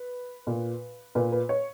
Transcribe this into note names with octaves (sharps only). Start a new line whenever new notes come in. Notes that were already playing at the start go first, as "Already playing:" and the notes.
Already playing: B4
A#2
A#2 B4
B4
C#5